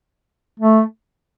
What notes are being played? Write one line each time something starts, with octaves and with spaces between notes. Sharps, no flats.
A3